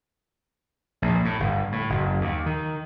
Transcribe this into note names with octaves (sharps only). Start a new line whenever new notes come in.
A#1
A2
G1
A2
F#1
D#2
D#3